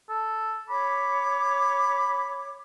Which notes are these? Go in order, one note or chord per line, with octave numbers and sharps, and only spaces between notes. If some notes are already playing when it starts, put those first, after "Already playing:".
A4
C#5 B5 D6